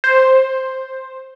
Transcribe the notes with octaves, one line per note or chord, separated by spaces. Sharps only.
C5